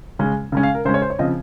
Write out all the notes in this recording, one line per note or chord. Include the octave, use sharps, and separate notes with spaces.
C#3 G#3 C#4
C#3 G#3 C#4
F5
A#4
C#3 G#3 C#4 C5
C#5
C5
C#5
C#3 F3 C4 D#5